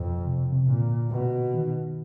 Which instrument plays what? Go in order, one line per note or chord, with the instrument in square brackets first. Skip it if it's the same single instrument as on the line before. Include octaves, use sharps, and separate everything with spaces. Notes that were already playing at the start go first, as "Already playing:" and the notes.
Already playing: [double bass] F2 [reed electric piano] B2
[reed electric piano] C3
B2
C3
[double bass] A#2 [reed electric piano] D3
[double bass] B2
[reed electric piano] D#3